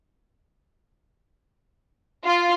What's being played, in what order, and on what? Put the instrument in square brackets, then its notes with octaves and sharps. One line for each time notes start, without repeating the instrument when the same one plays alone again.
[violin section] F4